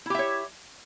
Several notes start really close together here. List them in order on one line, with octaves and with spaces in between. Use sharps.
E4 G4 E5 C#5